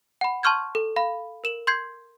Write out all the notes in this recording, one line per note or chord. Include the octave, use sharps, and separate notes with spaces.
F#5 B5
A5 C6 C#6 F6 G6 G#6
A4
F5 B5
A#4 E7 F#7
C6 G6 G#6 C7